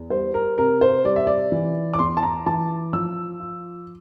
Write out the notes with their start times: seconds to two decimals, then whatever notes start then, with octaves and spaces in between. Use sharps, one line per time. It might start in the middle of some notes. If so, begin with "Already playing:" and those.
Already playing: E2
0.10 G3 C5
0.34 A#4
0.58 C3 A#4
0.81 C5
1.05 G3 D5
1.16 E5
1.27 D5
1.52 E3
1.94 D6
1.99 E2 C6
2.17 A5
2.23 A#5
2.46 E3 A5
2.93 F3 E6
3.40 F4